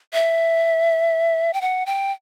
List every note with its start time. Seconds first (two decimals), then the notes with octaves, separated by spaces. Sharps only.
0.13 E5
1.53 G5
1.61 F#5
1.86 G5